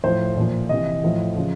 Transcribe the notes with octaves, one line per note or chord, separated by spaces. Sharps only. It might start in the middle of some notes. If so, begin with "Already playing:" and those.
A2 F3 C5
A#2 F3
C3 E3 D#5
A2 F3
C#3 F3